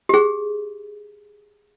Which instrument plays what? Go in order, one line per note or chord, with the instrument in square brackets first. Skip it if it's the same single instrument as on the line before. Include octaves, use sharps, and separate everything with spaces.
[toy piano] G4 G#4